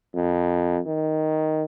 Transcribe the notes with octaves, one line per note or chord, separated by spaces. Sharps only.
F2
D#3